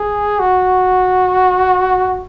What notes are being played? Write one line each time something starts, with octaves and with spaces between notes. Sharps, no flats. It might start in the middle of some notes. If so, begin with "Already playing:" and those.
Already playing: G#4
F#4